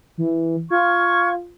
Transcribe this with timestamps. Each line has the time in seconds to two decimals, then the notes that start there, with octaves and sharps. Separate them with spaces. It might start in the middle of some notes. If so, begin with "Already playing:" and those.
0.18 E3
0.70 F4 C#6 F6 G#6